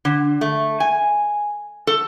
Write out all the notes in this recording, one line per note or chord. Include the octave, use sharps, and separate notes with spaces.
D3
A3
G#5
A4